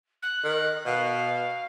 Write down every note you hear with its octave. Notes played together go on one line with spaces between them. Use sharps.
F#6
D#3
B2 F5